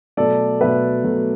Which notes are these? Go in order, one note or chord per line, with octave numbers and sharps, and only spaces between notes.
B2 F#3 A3 A4 D5
B2 F#3 A3 B4 E5
B2 F#3 A3